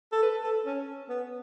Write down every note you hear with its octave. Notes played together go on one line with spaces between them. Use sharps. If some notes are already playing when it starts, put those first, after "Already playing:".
A4
B4
A4
C#4
B3